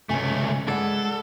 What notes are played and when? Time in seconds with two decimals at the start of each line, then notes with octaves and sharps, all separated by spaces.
0.09 C#2 C3 A3 G#5
0.68 G#3 G#4 A4 B4 D5 F#5